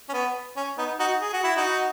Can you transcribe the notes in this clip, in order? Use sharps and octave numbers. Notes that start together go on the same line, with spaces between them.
C#4
B3
C#4
B3 D#4
D#4 F#4
G#4
F#4
E4
D#4 F#4